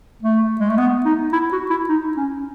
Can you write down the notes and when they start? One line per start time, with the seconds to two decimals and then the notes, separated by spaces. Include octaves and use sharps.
0.23 A3
0.60 G#3
0.70 A3
0.78 B3
1.05 D#4
1.33 E4
1.52 F#4
1.70 E4
1.89 D#4
2.17 C#4